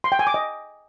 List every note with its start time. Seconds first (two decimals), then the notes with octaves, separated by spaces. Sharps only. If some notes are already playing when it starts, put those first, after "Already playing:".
0.04 C6
0.12 G5
0.19 G#5
0.27 D6
0.34 D#5